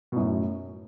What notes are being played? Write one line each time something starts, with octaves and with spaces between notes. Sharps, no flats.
B2
F#2 A2